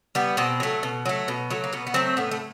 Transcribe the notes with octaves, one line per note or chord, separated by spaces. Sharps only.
G3 B3
B2 C4
F#3 A3
B2
F#3 A3
B2
F#3 A3
A#3
B2 B3
B3
F#3 A3 C4
A2 B3
A3